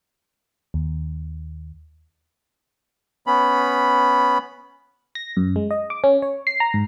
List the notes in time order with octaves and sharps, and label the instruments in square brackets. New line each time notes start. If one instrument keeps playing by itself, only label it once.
[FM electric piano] D#2
[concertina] B3 C#4 B5
[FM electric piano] A#6
F#2
G#3
D#5
D6
C#4
C#5
C7
A#5
G#2